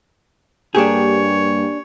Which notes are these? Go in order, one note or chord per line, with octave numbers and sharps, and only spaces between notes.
G2 A#3 D4 G4 G#4 C#5